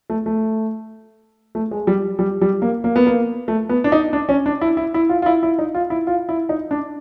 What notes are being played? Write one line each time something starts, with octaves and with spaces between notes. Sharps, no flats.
A3
A3
A3
G#3
G3
G3
G3
A#3
A#3
B3
A#3
A3
B3
D4
D#4
D4
C#4
D4
E4
E4
E4
F4
F4
E4
E4
D#4
F4
E4
F4
E4
D#4
D4